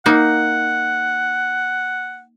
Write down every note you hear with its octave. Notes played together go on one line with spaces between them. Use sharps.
A#3 D#4 F#5